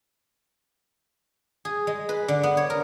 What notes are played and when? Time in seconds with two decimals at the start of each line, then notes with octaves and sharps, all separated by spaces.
1.65 G#4
1.87 G#3
2.09 B4
2.28 D3
2.43 B3
2.57 C#5
2.70 A#4